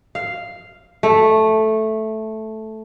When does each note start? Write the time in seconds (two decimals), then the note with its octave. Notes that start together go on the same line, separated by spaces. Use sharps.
0.15 F5
1.03 A3